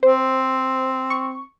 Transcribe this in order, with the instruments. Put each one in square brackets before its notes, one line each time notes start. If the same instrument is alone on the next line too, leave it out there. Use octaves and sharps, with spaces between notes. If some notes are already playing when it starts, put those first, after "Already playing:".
[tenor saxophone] C4 [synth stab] C5
[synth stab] C#6